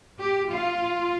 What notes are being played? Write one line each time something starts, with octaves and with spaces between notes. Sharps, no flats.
G4
F4